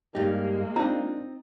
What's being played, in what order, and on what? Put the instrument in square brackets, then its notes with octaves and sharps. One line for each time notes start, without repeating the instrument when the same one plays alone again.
[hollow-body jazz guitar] G2 D#4 [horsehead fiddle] G#3 A#3 [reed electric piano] G4
[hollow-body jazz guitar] C4 D#4 [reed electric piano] D4 F4 [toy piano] A#5